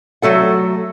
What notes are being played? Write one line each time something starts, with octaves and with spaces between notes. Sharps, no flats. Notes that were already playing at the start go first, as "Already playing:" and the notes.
F#3 A3 A4 F#5